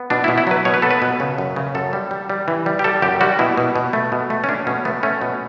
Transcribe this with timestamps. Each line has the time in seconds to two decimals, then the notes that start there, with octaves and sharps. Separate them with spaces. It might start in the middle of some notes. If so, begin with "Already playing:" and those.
Already playing: B3
0.10 B2 D4
0.24 E4
0.28 B2
0.38 E4
0.47 F#3 B4
0.65 B2 C#5
0.74 B4
0.82 B3 A4
0.91 B4
1.02 B2
1.20 C#3
1.38 F#2
1.56 C#3
1.75 F#2 A4
1.93 G3
2.11 G3
2.30 G3
2.48 E3
2.66 G3
2.79 G4
2.84 G3 A4
3.02 F#2 G4
3.21 G3 F#4
3.39 B2 E4
3.57 B2
3.76 B2
3.93 A3
4.12 B2
4.30 A3
4.44 C#4
4.48 A3 D4
4.67 B2 C#4
4.85 A3 B3
5.03 A3 C#4
5.21 B2